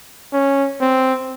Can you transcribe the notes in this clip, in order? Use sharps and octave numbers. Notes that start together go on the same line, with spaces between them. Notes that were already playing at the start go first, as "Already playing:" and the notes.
C#4
C4